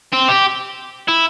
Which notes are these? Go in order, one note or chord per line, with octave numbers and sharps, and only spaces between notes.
C4
G4
E4